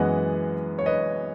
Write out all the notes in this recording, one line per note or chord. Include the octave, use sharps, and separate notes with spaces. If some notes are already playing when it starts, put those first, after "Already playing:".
Already playing: F#2 E3 G#3 B3 D#5 F#5
C#5
B4 D#5